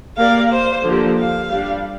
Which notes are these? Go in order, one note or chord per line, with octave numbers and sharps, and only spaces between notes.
A#3 G4 A#4 D5 F5
C5
D3 F3 A#3 G4
F5
G3 D4 G4